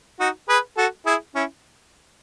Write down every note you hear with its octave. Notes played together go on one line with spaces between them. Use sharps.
D#4 F#4
G#4 B4
F#4 A4
E4 G#4
C#4 E4